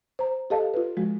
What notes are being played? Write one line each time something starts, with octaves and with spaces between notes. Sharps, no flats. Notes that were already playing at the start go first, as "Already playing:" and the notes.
C5 A#5
G4 A4 D#5 F5 A5
F4 B4
F3 G#3 F#4